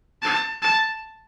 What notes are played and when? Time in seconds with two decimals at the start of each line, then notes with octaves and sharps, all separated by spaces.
0.22 A5
0.62 A5